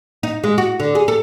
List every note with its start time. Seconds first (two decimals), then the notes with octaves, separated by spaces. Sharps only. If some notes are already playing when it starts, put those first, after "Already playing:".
0.23 D#4
0.44 G#3
0.58 F#4
0.80 D3
0.95 G#4
1.08 A4